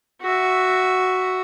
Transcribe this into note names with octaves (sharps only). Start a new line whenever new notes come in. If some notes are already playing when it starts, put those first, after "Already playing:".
F#4 E5